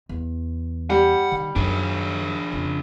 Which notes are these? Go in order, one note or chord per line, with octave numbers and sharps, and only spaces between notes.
E2
G3 F#5
D#3
F#2 D#3 D4 G#4
F2 C#3